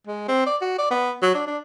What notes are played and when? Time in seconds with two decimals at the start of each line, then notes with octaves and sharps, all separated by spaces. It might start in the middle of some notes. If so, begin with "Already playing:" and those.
0.07 G#3
0.28 C4
0.46 D5
0.61 F#4
0.78 D5
0.91 B3
1.22 F#3
1.35 D4
1.47 D4